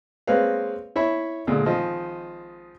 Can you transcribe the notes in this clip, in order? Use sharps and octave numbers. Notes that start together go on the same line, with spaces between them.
G#3 A#3 C4 B4 C#5 F5
E4 C#5 E5 B5
D2 A#2 G#3
G#1 F3 D#5